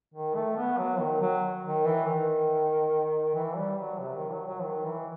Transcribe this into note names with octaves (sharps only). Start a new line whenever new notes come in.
D#3
A3
B3
F#3
D#3
F#3
D#3
E3
D#3
E3
G3
F#3
C3
D#3
F#3
F#3
D#3
E3